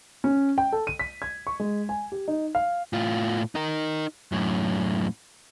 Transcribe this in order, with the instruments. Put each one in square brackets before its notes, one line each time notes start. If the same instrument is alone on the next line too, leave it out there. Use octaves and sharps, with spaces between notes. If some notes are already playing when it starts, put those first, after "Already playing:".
[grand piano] C#4
G5
A4
D#7
B6
G#6
C#6
G#3
G#5
G4
D#4
F5
[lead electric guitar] A2 F4
D#4 A#4
F#2 A2